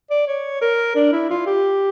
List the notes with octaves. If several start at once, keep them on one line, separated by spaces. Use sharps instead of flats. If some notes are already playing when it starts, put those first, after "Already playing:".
D5
C#5
A#4
D4
E4
F4
G4